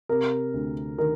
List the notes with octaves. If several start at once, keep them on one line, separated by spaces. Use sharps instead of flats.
C3 A#4
D2
D#3 A#4